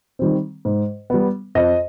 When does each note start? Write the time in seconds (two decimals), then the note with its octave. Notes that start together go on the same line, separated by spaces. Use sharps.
0.19 D#3 G3 C4
0.65 G#2
1.10 G3 B3
1.55 F2 D#5